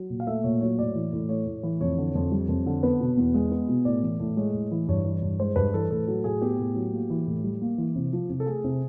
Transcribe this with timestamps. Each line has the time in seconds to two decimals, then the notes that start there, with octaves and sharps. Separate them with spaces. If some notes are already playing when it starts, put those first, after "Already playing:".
Already playing: F#3
0.10 A#2
0.20 F5
0.27 A3 E5
0.44 A#2 C#5
0.61 F#3 C#5
0.78 A2 D5
0.95 E3
1.13 A2
1.29 A3 C#5
1.46 A2
1.63 E3
1.81 F2 C#5
1.98 D3
2.15 F2
2.32 G3
2.49 F2
2.66 D3
2.83 B3 B4
3.00 B2
3.17 E2
3.34 G#3 G#4
3.51 B3
3.69 B2
3.85 A2 D5
4.03 E3
4.20 A2
4.37 G#3 C#5
4.54 A2
4.71 E3
4.88 G2 C#5
5.05 E3
5.22 G2
5.40 G#3 C5
5.56 G2 B4
5.73 E3 A4
5.91 A2 A4
6.07 F#3 A4
6.24 A2 G#4
6.42 B3 G4
6.59 A2
6.75 F#3
6.94 A#3
7.10 E3
7.27 A2
7.44 G3
7.62 A#3
7.78 E3
7.95 C3
8.13 F3
8.30 C3
8.40 A4
8.46 A3 G#4
8.64 C3